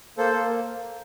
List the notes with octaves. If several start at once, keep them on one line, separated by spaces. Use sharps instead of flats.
A#3 A4 C5
A#3